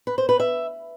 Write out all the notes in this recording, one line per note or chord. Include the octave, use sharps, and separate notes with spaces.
B4
C5
B4
E5